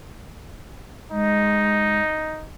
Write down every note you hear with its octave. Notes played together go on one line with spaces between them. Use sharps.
G#3 D#4